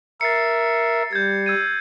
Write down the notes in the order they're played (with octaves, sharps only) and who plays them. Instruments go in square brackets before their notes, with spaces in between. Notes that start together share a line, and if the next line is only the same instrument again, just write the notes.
[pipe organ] A#4 E5 [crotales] A6 C7 C#7
[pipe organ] G3 [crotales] G6 G#6
[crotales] E6 G#6 D#7